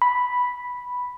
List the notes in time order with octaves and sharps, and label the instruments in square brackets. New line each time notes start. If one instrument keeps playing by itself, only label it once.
[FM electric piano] B5